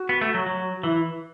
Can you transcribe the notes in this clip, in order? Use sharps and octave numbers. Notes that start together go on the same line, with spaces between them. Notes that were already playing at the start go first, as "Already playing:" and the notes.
Already playing: F#4
B3
A3
F#3
F#3
E3 E4